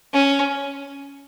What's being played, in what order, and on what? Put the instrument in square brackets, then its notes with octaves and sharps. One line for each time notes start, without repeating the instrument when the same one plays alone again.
[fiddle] C#4